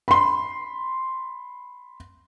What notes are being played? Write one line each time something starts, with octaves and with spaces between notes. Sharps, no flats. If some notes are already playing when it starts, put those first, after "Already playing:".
B5 C6